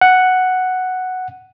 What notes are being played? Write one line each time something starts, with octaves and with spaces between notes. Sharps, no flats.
F#5